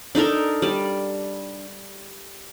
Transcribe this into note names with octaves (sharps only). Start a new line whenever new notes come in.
D4 D#4 A4 A#4
G3 D5